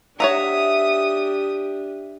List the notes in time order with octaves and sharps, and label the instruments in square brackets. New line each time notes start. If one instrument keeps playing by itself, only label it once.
[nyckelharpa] D4 G4 [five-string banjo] C#5 F#5 A#5 [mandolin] E5 [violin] D#6